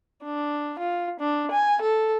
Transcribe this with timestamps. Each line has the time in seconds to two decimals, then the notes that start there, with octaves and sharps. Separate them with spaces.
0.24 D4
0.79 F4
1.20 D4
1.52 G#5
1.82 A4